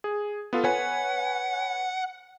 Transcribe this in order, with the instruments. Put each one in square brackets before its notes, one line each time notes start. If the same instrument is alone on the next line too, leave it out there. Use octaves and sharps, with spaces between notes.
[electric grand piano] G#4
B3 F4 A4
[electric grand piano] B4 C#5 G#5 [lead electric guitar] F#5